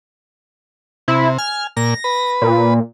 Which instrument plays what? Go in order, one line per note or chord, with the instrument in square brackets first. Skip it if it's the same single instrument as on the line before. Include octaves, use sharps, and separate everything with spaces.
[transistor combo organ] C3 [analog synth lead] E4
[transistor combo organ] G#5 [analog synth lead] F6
[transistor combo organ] A#2 [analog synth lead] A#6
[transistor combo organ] B4
[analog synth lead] A#2